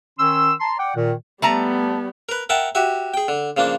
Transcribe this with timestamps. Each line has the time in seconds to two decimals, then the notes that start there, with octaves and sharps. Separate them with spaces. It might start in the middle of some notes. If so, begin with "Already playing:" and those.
0.19 D#3 C#4 C6 E6
0.60 A5 A#5 C6
0.78 D5 F#5 G5
0.95 A#2 D#3
1.42 G3 A3 B3 A5 A#5
2.29 A#4 B4
2.49 A#4 E5 F#5 G5 A5
2.75 F#4 G4 E5
3.14 G#4 G5
3.28 D3
3.57 C#3 F3 A#3 D4